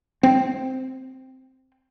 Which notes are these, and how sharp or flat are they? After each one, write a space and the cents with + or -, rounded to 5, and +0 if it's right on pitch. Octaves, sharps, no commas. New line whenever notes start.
C4 +0